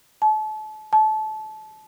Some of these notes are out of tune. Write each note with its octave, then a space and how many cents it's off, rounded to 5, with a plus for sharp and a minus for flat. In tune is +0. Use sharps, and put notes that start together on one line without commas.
A5 -35
A5 -25